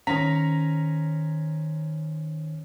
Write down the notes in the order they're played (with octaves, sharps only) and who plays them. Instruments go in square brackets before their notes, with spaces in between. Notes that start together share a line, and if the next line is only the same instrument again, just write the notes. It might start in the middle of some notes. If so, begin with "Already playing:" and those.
[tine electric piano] D#3 C5 B6 [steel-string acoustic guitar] C#4 [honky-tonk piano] A#5